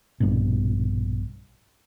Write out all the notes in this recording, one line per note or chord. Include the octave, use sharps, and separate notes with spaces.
A#1 G2 B2